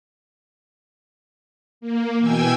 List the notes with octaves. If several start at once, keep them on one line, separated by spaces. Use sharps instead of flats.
A#3
B2 E3 G5 G#5 E6 G#6